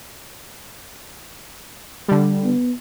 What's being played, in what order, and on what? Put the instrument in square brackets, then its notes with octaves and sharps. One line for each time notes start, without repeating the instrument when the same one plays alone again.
[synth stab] D3 G3
[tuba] B3